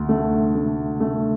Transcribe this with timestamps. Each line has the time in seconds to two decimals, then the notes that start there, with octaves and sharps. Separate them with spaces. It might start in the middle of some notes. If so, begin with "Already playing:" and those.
Already playing: D2
0.09 A3
0.55 A3
1.00 A3